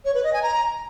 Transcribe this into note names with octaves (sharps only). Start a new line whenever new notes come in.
C#5
B4
D#5
G#5
A#5